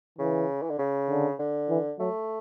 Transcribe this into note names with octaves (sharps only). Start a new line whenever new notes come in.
C#3 E3
E3
D3
C#3
D3
D3
E3
F#3 A3